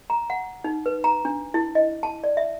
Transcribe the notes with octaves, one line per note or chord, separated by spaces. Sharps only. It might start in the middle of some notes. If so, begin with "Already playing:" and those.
A#5
F#5
D#4
B4
A#5
D4
E4
D#5
A5
D5
E5